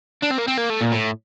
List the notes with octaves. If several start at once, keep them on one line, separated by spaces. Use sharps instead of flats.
D4
C4
A#3
C4
A#3
A3
A#2
A2